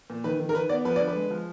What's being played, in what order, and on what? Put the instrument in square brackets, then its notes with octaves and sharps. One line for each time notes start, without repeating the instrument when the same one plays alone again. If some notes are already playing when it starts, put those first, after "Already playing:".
[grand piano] A#2
D#3 B4
D#3
A#4
D#3 B4
B3 D5
F3 B4
D3 D5
B4
G#3
F3